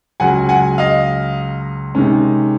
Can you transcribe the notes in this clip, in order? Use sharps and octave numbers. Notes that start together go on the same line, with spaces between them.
C#2 C#3 F#3 F#5 G#5
F#5 G#5
D#5 F5
C3 D#3 G#3 C#4